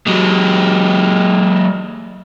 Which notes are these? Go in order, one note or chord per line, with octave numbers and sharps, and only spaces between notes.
F#3 G#3